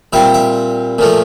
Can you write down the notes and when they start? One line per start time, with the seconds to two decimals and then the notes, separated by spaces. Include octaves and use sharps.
0.13 A#2 G3 C4 E5
0.34 E5
0.98 A#2 F3 A3